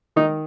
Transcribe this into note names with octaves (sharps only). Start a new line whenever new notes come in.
D#3 D#4